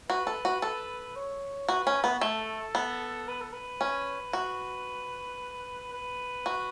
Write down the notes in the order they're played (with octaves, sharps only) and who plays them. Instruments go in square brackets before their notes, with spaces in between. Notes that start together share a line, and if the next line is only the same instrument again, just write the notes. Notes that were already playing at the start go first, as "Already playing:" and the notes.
[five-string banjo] F#4 [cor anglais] B4
[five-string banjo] A4
F#4
A4
[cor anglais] C#5
[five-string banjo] F#4 [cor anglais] B4
[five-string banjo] C#4
B3
[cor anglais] F#4
[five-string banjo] A3 [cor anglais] A4
[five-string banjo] B3
[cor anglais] B4
A4
B4
[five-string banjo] C#4
[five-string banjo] F#4 [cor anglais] B4
[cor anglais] B4
[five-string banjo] F#4